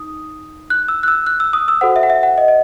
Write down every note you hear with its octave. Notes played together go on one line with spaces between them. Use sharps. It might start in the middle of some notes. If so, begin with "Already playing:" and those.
Already playing: D#4 D#6
F#6
E6
F#6
E6
F#6
E6
D#6
E6
F#4 A4 C5 F#5
E5
F#5
E5
F#5
D#5
D#5